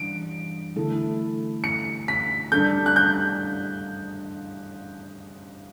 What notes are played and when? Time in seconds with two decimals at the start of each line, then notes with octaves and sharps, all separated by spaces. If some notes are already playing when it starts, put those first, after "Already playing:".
Already playing: E3 G3 D4 D7
0.76 D3 A3 E4 A4
1.64 C#7
2.08 B6
2.52 G3 D4 A4 G6
2.86 F#6
2.96 G6